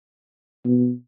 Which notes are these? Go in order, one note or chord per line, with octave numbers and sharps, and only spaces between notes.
B2